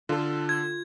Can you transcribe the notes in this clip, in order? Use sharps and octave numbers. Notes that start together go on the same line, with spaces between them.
D3 F4 A4
G#6